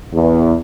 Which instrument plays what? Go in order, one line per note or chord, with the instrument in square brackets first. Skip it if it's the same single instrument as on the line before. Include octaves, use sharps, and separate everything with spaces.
[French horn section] E2